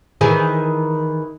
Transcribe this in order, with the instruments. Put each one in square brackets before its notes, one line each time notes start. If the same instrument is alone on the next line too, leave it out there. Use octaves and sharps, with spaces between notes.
[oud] D#3 E3 G#4